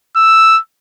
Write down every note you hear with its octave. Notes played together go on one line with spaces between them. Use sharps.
E6